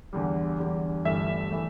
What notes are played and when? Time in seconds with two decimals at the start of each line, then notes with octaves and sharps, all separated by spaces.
0.13 E2 D3 G3
0.59 E2 D3 G3
1.05 G1 G2 E3 A3 E5
1.51 E3 A3